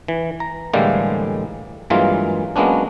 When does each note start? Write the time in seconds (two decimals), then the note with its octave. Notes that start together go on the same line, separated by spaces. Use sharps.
0.08 E3
0.40 A#5
0.74 A2 D3 E3 G3 G#3 A#3
1.90 G2 E3 F#3 G#3 A#3 F4
2.56 F#3 G#3 A#3 B3 C#4 D4